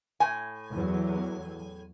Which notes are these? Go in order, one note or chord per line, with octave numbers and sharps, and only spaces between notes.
A2 G#5
E2 F#3